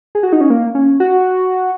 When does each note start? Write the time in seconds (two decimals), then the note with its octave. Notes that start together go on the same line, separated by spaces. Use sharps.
0.15 G#4
0.23 F#4
0.33 D#4
0.41 C#4
0.50 A#3
0.75 C#4
1.00 F#4